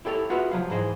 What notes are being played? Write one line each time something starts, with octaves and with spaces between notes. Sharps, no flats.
E4 G4 A4 B4 C#5
F4 F#4 G#4 B4 E5
C2 F3 F#3 F5
G#2 E3 G#4 C5 D#5